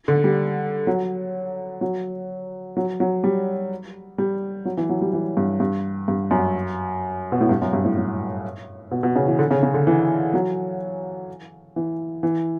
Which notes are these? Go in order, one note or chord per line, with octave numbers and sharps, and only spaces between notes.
D3
G3
F#3
F#3
F#3
F#3
G3
G3
F#3
E3
F#3
G3
E3
G2
G2
G2
F#2
B2
A2
G2
F#2
G2
A2
A2
B2
B2
C#3
E3
D3
C#3
C#3
D3
E3
F#3
E3
E3